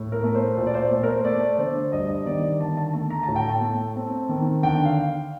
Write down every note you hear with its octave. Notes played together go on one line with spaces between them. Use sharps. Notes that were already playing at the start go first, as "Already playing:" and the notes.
Already playing: A2
A#4
A3
C5
A#2
D5
C5
A3 C5
A#4
C5
A3 D5
D3 C5
G2 D#5
D#5
D#3 D5
D3 A5
A5
A3 A5
A#5
A2 A5
G5
A5
A3
C4
D#3
D3 G5
F5